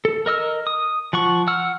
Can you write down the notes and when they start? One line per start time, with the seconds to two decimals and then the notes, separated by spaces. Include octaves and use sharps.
0.05 A4
0.26 A#4 D#5 E6 F6
0.67 D#6
1.13 F3 F#5 C#6
1.47 F#5 E6 F6